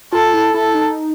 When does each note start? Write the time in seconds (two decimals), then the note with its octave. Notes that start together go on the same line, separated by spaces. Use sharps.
0.13 F4 A4
0.34 E4
0.54 E4 A4
0.75 D#4